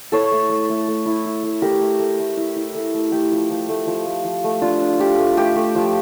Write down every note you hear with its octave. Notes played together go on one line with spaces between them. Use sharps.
E4 A4 C#5
A3
A3
A3
A3
E4
E4
A3
A3 G4 A#4
A3
A3
A3
E4
E4
A3
A3
A3 G4
F3
F3
A3
F3
A3
F3
A3
D4 F4
D4
F3 G4
A3
A3 G4
A3
F3